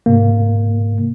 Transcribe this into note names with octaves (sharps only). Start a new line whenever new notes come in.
G#2 C3 A#3